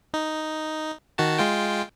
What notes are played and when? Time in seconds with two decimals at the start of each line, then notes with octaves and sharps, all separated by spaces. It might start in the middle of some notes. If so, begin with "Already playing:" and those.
0.14 D#4
1.18 D#3 F#4 A5
1.38 G#3 F4 G5